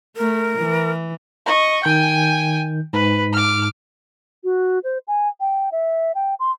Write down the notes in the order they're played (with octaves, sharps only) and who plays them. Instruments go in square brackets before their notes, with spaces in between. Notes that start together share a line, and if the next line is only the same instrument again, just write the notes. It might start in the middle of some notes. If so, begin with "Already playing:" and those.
[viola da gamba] A3 [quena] A#4
[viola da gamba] E3
[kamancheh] D#5 C#6
[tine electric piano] D#3 G6 [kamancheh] G5 G#5
[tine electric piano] G#2 [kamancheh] B4
[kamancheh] D6 F6
[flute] F#4
C5
G#5
G5
E5
G5
C6